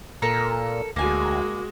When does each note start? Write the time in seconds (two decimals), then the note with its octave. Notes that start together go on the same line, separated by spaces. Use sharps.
0.22 A#2 A4 A#4 A#5
0.96 D2 G#3 A#3 F#4 G#5